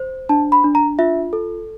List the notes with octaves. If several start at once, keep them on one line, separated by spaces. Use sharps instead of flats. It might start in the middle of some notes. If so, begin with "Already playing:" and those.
Already playing: C5
D4 A5
B5
D4
A#5
F4 E5
A4